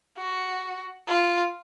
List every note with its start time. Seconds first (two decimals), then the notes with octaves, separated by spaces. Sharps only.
0.17 F#4
1.08 F4